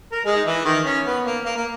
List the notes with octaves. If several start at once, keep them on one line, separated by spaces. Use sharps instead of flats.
A#4
G#3 G#4
D#4
E3 E4
D#3 D#4
C#4
B3
A#3
A#3
A#3